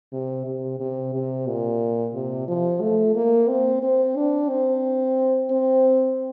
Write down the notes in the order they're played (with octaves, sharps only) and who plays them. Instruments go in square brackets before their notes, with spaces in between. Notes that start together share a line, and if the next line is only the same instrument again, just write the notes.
[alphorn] C3
C3
C3
C3
A#2
C3
F3
A3
A#3
C4
C4
D4
C4
C4